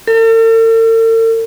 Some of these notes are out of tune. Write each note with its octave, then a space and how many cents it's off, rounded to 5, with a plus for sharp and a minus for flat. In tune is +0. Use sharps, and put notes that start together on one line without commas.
A4 +45